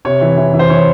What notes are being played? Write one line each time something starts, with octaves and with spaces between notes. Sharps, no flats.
C3 C#5
E3
E3
E3
C5
E3 C#5